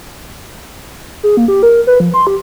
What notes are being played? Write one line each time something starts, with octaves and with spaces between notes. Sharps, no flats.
G#4
A#3
G4
A#4
B4
F3
C6
G4